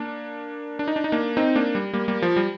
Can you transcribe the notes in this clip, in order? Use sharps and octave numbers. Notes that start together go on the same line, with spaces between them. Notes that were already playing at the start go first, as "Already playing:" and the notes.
Already playing: A#3 D4
D4
D#4
D4
D#4
A#3 D4
C4 D#4
A#3 D4
G3
G3 A#3
G3 A#3
F3
G3